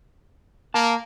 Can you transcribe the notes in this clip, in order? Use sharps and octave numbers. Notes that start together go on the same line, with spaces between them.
A#3 A5